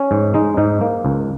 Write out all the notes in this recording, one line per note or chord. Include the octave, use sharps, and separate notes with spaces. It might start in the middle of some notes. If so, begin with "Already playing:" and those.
Already playing: C#4
G#2
G#3 D#4
G#2 D#4
A#3
C#2